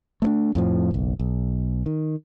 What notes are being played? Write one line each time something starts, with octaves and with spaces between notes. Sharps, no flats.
A3 B3 D4
F2 A2 F3
F#1 B1
B1
D#3